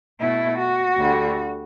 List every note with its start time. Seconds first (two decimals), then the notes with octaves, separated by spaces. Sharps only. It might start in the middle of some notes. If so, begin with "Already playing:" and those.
0.21 B2 A3 E4
0.60 F#4
0.98 D2 D3 G3